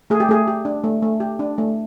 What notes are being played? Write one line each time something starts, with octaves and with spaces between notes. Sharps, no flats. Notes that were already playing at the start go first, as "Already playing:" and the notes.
A3 G#4
G4
A3 G#4
G4
D4
A3
A3
G4
D4
A3